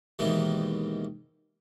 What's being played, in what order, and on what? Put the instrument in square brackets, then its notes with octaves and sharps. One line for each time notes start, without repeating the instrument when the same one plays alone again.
[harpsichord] D#2 G#2 B2 D#3 E3